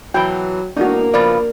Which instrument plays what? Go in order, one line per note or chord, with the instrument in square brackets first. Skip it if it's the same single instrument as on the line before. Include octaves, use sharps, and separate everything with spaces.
[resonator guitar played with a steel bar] B2 E3 [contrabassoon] F#3 [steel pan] G5
[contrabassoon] E1 [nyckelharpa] A#3 A#4 [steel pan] D4 F#4 [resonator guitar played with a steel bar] D#4
[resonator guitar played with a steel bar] C#3 B3 F4 [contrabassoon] F3 [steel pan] D5